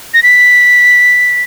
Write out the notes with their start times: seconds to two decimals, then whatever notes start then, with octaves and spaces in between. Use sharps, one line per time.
0.14 A#6
0.23 B6